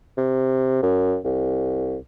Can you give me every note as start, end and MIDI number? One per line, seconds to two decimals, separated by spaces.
0.17 0.81 48
0.83 1.17 42
1.25 1.96 36